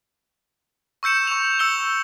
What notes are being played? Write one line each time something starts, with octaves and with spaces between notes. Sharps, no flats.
C#6 E6 G6 C#7 E7
C#6 F7
E6 C#7 G7